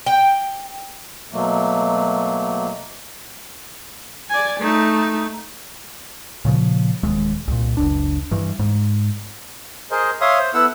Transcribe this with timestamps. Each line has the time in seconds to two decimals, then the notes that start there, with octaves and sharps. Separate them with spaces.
0.06 G5
1.32 B2 F#3 A3 A#3
4.30 D5 G#5
4.61 A3 D#4
6.45 A#2 C#3 E3 F3
7.03 E1 D#2 G#3
7.48 C2 A#2
7.77 F#1 C#2 D4
8.31 G2 E3
8.59 G#2
9.91 G#4 A#4 C5 D#5
10.21 C#5 E5 F5 C6 D#6
10.39 C5
10.54 B3 E4 A4 F#5 E6